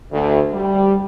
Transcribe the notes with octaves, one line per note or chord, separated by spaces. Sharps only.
D2
G3